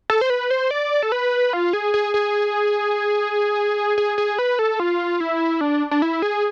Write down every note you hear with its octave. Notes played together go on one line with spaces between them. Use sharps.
A4
C5
B4
C5
D5
A4
B4
F4
G#4
G#4
G#4
G#4
G#4
B4
A4
F4
E4
D4
D4
E4
G#4